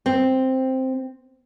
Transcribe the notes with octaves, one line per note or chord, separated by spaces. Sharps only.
C4